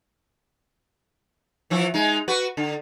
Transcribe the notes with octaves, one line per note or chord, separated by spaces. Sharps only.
E3 F3 E4
G#3 D#4
F#4 B4
D3